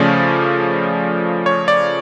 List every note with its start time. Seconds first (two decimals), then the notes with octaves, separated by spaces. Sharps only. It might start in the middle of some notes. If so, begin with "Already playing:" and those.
Already playing: C#3 F3 A3 C#4 D5
1.46 C#5
1.68 D5